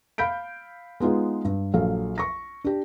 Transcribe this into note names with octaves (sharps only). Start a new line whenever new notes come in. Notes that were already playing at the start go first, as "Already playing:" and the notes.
F5 B5 G6 B6 D7
G#3 B3 D#4 F4 G#4
G2
A#1 F#3 A4 F5
C#6 A#6
D4 G4